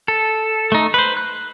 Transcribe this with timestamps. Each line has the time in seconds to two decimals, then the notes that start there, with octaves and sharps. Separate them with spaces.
0.08 A4
0.72 A3 D#4
0.94 B4 C5
1.17 F#6